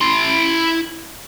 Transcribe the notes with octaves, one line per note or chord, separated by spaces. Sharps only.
E4 C6